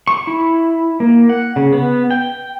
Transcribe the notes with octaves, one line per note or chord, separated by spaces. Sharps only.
C#6
E4
A#3
F#5
C#3
B3
G5